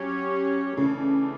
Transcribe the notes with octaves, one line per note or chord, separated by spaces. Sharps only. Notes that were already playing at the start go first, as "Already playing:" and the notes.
Already playing: F#3 C#4 G4 C#5
C#3 E3 A3 D4